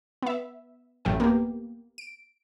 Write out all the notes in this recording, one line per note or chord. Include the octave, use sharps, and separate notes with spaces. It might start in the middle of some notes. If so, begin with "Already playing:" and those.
B3 E5
A1 F#2 A3 G5
A#3 B3 G4
D7